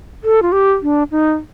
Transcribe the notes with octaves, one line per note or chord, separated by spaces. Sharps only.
A4
F4
G4
D4
D#4